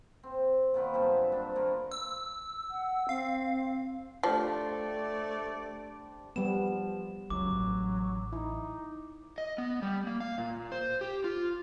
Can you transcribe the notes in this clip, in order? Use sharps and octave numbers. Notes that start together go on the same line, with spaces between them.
C4
A#2 D#3 B3 C4
G2 F#3 E5 A5
D4 C5
D#3 A#3 F4 B4
E6
F#5
C4 F5
F3 A3 D4 G4 C5 D5
F3 G3 B3 E7
F#1 C#2 F#2 F#3 D6
A1
D#4 E4
D#5
B3
G3
A#3
F5
A#2
C5
G4
F4